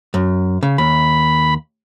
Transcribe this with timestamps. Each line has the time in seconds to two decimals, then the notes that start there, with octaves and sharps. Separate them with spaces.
0.14 F#2
0.63 C#3
0.78 D#2 B5